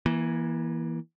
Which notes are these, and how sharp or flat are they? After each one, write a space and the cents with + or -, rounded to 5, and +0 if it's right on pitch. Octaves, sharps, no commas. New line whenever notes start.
E3 +0 A#3 +35